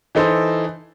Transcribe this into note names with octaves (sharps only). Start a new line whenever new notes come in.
E3 D#4 A4 C5